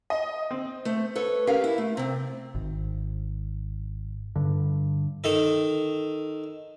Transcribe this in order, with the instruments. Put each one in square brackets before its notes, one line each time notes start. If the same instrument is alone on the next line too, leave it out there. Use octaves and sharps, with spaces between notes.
[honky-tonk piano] D#5
C4
[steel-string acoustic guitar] A3 C5
A4 B4 C#5
C#4 G4 A#4 B4 F5
E4
A3
C3 C4
[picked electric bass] G#1
G2 D3
[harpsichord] D#3 A4